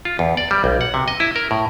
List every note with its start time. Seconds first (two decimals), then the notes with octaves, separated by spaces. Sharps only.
0.05 F4
0.19 E2
0.37 D5
0.51 G3
0.64 B1
0.81 F#5
0.94 C3
1.08 D#5
1.20 E4
1.36 A#4
1.51 A2